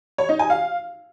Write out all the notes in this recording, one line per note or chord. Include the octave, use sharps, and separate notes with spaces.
C#5
D#4
G#5
F5